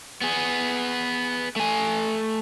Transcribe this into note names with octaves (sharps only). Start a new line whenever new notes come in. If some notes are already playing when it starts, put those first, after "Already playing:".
B3 G#4
A3 G#5